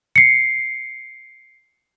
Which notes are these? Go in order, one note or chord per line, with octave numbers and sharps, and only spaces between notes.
C7 C#7